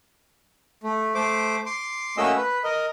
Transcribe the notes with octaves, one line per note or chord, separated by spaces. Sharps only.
A3
A3 C5 D6
C6 D6
A3 A#3 C#4 F#4 D#5 E6
B4
A#4 D#5